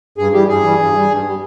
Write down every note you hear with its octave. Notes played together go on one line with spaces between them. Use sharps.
G2 G#4
E3 G3 G4
G2 G#4
E3 G3
G2
G3
G2
G3